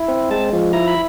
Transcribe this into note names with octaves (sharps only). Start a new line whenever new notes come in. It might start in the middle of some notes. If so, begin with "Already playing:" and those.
Already playing: E4
C4
G#3 A5
F3
E4 A#5
B5